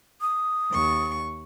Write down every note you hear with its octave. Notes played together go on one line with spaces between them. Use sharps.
D#6
D#2 C#6